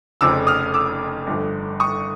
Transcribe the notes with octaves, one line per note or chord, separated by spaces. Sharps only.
F1 F2 C#3 F3 D6 E6
D#6 F6
D6 E6
G1 G2 D3 F3
C#6 D#6